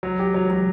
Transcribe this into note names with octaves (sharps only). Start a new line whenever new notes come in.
F#3
G4
F#3
F#3